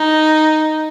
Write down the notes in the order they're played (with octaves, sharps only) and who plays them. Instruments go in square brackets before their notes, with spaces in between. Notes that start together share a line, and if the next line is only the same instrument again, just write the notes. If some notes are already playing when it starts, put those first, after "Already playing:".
Already playing: [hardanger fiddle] D#4